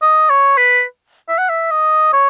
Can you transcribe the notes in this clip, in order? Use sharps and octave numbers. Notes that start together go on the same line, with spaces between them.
D#5
C#5
B4
E5
F#5
E5
D#5
C#5